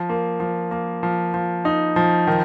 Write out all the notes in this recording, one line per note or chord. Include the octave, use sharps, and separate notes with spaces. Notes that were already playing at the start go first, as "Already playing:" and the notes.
Already playing: F3
A#3
F3
A#3
F3
F3
D#4
F3
D#3